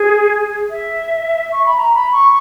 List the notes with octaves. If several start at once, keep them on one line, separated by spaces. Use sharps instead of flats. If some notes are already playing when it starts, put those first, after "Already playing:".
Already playing: G#4
E5
C#6
B5
A#5
B5
C#6